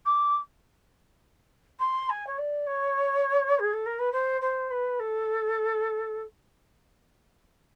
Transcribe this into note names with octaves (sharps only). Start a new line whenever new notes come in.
D6
C6
G#5
C#5
D5
C#5
G#4
A4
A#4
B4
C5
C5
B4
A4